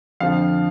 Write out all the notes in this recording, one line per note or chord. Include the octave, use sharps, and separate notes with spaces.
F2 D3 F3 F5